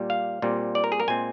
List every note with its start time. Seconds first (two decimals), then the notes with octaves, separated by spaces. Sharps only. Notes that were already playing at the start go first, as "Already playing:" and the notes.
Already playing: A#2 G3 A#3
0.10 F5
0.42 A#2 G3 C4
0.75 D5
0.84 A#4
0.92 G#4
1.00 A#4
1.08 A#2 G#3 C4 G#5